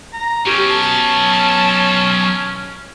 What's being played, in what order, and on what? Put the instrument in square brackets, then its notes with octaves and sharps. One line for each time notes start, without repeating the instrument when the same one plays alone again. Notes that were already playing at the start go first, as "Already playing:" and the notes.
[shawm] A#5
[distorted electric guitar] F#3 B3 [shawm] C#4 [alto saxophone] G4
[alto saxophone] A5